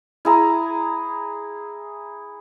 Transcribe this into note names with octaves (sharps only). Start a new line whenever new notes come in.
E4 G#4 A#5